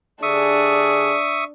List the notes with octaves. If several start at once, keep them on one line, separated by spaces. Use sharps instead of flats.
D3 D4 G4 G#4 E5 C#6 D#6